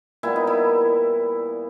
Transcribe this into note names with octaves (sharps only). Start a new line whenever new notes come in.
A#2 G3 B3 E4
D#4
E4